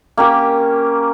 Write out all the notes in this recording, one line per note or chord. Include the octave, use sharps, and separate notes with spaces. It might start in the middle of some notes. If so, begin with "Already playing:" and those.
A#3 C#4 G4